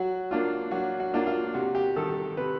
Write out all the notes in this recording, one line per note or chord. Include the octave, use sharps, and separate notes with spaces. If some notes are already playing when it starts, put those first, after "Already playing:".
Already playing: F#3 F#4
A#3 D4 F4
F#3 F#4
F#4
A#3 D4 F4
F4
C3 F#4
G4
D#3 G3 A4
C3 B4